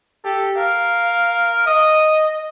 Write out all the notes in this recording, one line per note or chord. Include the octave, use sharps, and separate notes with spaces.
G4 A4
A#4 F5
D#5 D#6